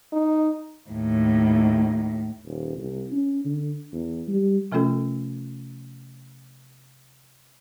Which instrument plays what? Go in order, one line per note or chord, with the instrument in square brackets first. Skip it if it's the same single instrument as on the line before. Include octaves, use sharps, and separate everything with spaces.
[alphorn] D#4
[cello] D#2 A2
[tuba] D#1
C2
C#4
D3
E2
G3
[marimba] C3 F3 A3 C#4 F4 A4